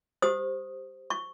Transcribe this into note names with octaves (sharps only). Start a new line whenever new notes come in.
G4 C5 D#6
C#6